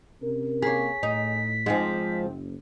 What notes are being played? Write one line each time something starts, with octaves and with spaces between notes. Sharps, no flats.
C3 C#4 A#4
A#3 G#4 C#5 B6
A2 D#4
G#2 F3 G#3 C4
F#1